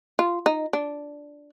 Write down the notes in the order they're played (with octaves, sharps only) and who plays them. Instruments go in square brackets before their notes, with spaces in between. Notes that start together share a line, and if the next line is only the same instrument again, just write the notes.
[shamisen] F4
D#4
D4